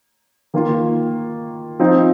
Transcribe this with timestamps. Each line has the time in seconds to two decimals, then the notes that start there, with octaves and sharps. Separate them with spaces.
0.54 D#3 A#3 F4
1.80 F3 C4 D#4